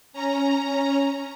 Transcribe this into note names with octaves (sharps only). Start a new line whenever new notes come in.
C#4 A#5